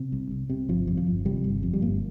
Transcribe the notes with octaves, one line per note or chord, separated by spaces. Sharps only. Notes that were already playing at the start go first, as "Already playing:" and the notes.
Already playing: C3
C2
C2
C3
G1 F3
F2
F3
G1
C3 G3
G1
F2
G3
G1 A#3